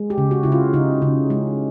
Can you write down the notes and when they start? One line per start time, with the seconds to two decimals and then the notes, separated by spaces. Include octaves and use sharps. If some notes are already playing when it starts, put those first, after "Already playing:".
Already playing: G#3
0.10 G4
0.18 C#3
0.31 F#4
0.43 C#3 E4
0.52 F4
0.73 C#3 D#4
1.02 C#3
1.30 G#3